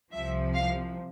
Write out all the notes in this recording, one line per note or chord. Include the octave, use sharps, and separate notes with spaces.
C2 C3 F3 E5
F5